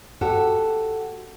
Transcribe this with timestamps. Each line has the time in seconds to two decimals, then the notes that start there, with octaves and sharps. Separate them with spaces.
0.21 F#4 G4 A4